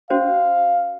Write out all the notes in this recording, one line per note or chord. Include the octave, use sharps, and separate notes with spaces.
C#4 F#4 C5 F5